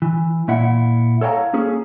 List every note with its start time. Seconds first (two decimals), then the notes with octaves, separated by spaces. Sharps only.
0.02 E3
0.48 A#2 E4 F#5
1.21 A4 C#5 F5 G5 A#5
1.53 A#3 C#4 G#4 A4